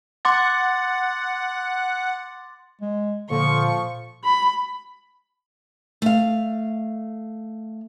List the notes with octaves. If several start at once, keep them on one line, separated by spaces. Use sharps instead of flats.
F#5 C6 D6 A6
G#3
A#2 D3 F3 C#6
B5
A3 F5